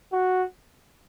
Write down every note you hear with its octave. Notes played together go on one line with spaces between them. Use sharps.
F#4